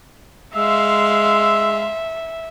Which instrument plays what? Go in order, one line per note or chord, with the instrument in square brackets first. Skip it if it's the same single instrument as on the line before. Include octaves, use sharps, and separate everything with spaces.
[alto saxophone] G#3 [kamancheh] E5 [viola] F5 C6 [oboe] E6